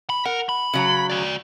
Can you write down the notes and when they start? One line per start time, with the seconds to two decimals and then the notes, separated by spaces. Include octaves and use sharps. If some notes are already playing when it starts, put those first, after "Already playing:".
0.10 B5
0.25 A#4 F#5
0.49 B5
0.73 C#3 F#3 A#5
1.10 F#4 D5